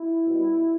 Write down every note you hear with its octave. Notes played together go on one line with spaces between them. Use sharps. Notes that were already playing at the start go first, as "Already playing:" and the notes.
Already playing: E4
B2 G3